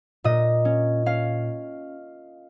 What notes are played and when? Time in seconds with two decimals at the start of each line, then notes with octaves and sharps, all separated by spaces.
0.24 A#2 D#5
0.65 C#4
1.06 C#4 F5